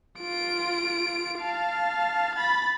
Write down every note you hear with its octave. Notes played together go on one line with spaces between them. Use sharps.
F4 D7
F5 A5
B5 A6